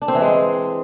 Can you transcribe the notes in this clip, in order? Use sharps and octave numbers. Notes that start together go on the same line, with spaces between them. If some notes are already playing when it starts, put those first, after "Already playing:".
D4
C4
E3
G#3